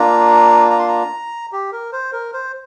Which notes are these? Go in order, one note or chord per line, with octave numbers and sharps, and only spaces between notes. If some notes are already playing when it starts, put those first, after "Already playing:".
Already playing: A#3 D4 F4 A#5
A#5
C6
A#5
G4
A#4
C5
A#4
C5